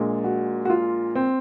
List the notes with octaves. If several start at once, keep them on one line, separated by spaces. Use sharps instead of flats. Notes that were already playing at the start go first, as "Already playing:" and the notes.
Already playing: A#1 A#2 G#3
F#4
F#4
F4
C4